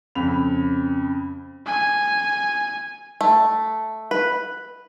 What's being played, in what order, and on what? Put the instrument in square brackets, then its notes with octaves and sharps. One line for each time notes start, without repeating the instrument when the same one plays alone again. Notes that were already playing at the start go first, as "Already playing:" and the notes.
[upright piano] F2 C#3 B5 F7
[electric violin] G#5
[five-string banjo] A3
B4